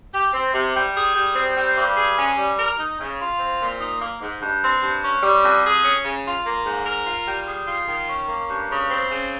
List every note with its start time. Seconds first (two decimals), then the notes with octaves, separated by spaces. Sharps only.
0.13 G4
0.34 C4
0.54 C3
0.75 G3
0.95 G#4
1.15 G3
1.35 C4
1.55 G3
1.77 G2
1.97 G#4
2.17 C#4
2.38 G3
2.58 A#4
2.79 D#4
2.99 C#3
3.20 F4
3.39 C4
3.60 A#2
3.80 D#4
4.01 A#3
4.21 G#2
4.41 G2
4.62 C4
4.83 G2
5.03 C#4
5.23 G3
5.43 F2
5.64 G#4
5.84 C#4
6.05 C#3
6.25 F4
6.46 A#3
6.66 G#2
6.86 A#4
7.07 F4
7.27 G3
7.48 G#4
7.67 F4
7.88 D#3
8.09 C#4
8.29 A#3
8.49 G2
8.70 C#3
8.90 C4
9.11 C#3